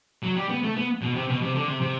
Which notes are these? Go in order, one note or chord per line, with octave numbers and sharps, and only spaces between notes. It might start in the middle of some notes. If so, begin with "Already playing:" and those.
F#3
G3
B3
A3
B3
B2
C3
B2
C3
D3
C3
C3